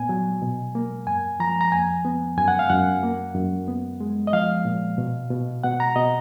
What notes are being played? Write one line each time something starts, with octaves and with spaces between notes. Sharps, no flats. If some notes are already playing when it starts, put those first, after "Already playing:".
Already playing: A#2 B3 G#5
F#3
B2
A#3
F#2 G#5
F3 A#5
A#5
F2 G#5
B3
F#2 G#5
F#5
F5
F#2 F#5
A#3
F#2
B3
G#3
D#5
F3 F5
A#2
B2
B2
B2 F#5
A#5
B2 D#5